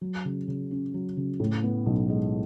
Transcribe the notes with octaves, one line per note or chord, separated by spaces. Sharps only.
F#3
C#3
C#3
C#4
F#3
C#3
A2
B3
B1
G#3